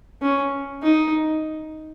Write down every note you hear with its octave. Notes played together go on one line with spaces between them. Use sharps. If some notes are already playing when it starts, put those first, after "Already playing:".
C#4
D#4